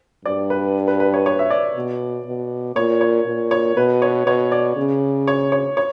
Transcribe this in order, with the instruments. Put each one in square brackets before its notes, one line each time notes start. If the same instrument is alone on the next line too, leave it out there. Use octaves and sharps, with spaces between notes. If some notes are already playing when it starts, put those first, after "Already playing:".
[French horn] G2 [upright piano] D5
[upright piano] B4
B4
B4
C#5
C#5
E5
D5
[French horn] B2
B2
[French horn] A#2 [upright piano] C#5
[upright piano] C#5
[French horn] A#2
[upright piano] C#5
[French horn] B2 [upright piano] B4
[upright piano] C#5
[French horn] B2 [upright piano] C#5
[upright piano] D5
[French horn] C#3
[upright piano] C#5
C#5
C#5